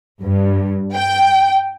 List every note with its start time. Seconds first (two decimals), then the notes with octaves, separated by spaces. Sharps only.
0.21 G2
0.95 G5